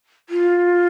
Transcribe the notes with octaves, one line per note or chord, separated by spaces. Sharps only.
F4